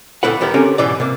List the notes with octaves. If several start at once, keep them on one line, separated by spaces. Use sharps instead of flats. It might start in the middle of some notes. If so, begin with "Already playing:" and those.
D2 A#2 A3 E4 B4 F#5
D#2 G3 B3 E4 A#4
D3 C4 C#4 G4 A#4
G#2 B2 E3 D5
C3 A#3